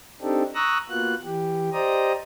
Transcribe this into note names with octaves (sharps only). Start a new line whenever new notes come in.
C4 D4 D#4 G4 A4
A#5 C#6 D#6 E6 F#6 A#6
A#3 B3 F4 F#4 F#6
E3 G4
G4 C5 D5 D#5 A#5 D#6